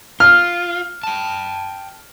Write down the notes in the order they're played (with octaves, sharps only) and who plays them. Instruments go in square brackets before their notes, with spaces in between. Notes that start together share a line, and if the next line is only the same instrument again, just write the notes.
[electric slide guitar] F4 [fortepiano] F6
[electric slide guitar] G5 A5